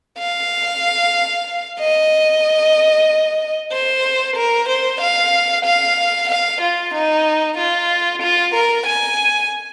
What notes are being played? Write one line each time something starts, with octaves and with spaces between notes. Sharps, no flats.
F5
D#5
C5
A#4
C5
F5
F5
F5
F4
D#4
F4
F4
A#4
G#5